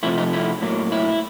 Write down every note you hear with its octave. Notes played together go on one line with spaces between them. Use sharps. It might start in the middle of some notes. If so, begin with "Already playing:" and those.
F2 C3 F3 A3 E4
D#4
E4
A2 F#3 A#3
E4